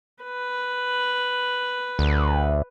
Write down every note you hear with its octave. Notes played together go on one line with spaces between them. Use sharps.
B4
D2